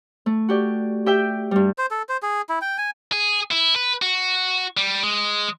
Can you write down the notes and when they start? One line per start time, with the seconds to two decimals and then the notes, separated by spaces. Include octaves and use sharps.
0.26 A3
0.48 F#4 G4 D5
1.06 G4 E5 G5
1.51 G2 G3
1.78 C5
1.91 A4
2.09 C5
2.23 G#4
2.49 E4
2.61 G5
2.78 G#5
3.12 G#4
3.51 E4
3.76 B4
4.02 F#4
4.77 G3
5.03 G#3